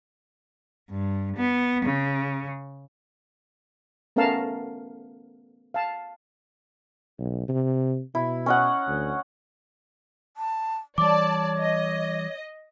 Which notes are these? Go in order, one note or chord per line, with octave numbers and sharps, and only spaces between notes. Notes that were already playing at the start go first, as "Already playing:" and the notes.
G2
B3
C#3
A3 B3 C#4 A#4 F5 A5
F5 A5
B1
C3
B2 E4
C#4 D#5 F#5
D2
A5
E3 G3 C#5 D5 A5 D6
D#5